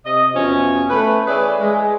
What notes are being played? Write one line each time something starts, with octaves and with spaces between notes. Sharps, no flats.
C3 D#5
E2 B2 F3 C#4
A3 B4
E3 G#4 B4 C#5 D5
G#3